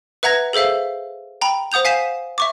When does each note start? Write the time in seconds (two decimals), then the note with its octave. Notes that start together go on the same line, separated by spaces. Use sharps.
0.23 B4 E5 F#5 A#5 G#6 A#6
0.53 G#4 A4 C5 E5 F5
1.41 G5 A#5 B5
1.72 C5 F#5 D#6 G6 F7
1.85 F5 G#5 B6 C7 E7
2.38 E5 C#6 D6